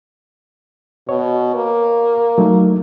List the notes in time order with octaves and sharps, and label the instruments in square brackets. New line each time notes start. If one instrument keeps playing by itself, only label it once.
[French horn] B2 [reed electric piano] C#5
[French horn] A#3
[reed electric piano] F#3 A3 D#4